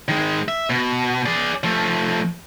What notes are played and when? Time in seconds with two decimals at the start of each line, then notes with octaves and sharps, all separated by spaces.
0.08 D#3 G#3
0.48 E5
0.70 B2
1.26 G#4 D5
1.64 F3 A3